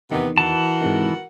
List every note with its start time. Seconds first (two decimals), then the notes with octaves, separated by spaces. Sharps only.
0.12 E2 C3 D#3 B3
0.38 E3 F#4 A#4 F#5 A5
0.81 G#2 C3 D#3